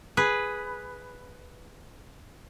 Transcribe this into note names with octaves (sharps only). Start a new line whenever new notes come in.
G#4 B4